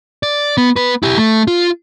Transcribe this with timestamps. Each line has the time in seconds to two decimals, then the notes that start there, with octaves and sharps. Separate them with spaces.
0.23 D5
0.58 B3
0.76 B3 B4
1.03 E4 G4
1.17 A3
1.47 F4